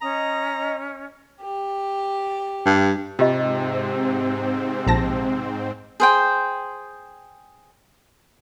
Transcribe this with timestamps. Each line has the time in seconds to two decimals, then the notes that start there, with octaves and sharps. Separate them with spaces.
0.01 C#4 D#5 A#5
1.41 G4
2.65 G2
3.19 G#2 C3 C4 F4 G4 D#5
4.87 A#1 A5 A#6
6.00 G#4 C5 G5